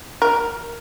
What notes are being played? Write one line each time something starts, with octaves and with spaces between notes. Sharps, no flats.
A#4